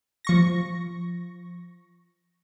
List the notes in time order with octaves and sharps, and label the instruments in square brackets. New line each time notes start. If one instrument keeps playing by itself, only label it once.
[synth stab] F3 C#6 A#6